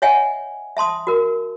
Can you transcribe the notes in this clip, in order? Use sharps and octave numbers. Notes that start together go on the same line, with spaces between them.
C#5 D#5 E5 F#5 G#5
E5 A5 C6 D#6
F#4 A#4